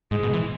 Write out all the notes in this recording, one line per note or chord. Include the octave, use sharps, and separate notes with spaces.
G#2 G#3
B2
E3